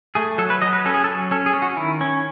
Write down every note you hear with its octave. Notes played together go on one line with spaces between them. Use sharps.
A3 G#4
F#3 A4
B4
F#3 D#5
B4
C#4 A4
G#4
A4
F#3
C#4 A4
G#4
C#4
F#4
D#3 E4
C#4